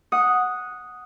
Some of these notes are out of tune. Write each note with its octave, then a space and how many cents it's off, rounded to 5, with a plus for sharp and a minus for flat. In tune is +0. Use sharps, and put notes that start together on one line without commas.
F#5 -10 D#6 +0